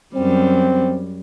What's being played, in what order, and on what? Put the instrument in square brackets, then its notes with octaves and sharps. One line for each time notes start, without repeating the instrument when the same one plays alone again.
[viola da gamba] F#2 G3 [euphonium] C4